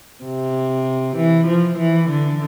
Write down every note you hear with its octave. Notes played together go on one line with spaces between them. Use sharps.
C3
E3
F3
E3
D3